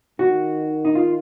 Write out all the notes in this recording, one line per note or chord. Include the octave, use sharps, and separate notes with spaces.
D#3 F#4
D#4
F4